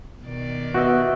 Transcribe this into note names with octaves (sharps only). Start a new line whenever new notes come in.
B2 D#3 D5
C3 B3 F#4 D#5 E5